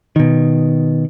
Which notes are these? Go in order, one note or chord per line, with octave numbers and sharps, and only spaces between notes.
B2 D#3